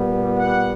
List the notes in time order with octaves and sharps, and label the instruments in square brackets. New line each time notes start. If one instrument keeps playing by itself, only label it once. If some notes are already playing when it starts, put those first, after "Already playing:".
Already playing: [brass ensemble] A#2 G3 B3
F#5